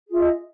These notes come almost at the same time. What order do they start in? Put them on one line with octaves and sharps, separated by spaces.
G#4 F4 E5 D#5